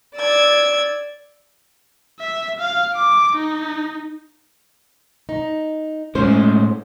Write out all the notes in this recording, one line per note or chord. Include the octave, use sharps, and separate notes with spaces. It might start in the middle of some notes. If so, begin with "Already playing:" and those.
D5 E6 G#6
E5
F5
D6
D#4
D#4
A2 G#3 C#4 C5